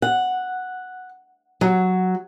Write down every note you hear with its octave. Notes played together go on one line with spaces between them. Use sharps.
F#5
F#3